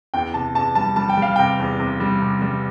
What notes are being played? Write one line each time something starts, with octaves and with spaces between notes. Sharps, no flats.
E2 G5
C3 A5
E2 A5
G3 A5
G3 A5
G5
G3 F5
C3 G5
E2
C3
G3
C3
G3